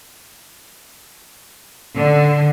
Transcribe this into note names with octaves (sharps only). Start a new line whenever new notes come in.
D3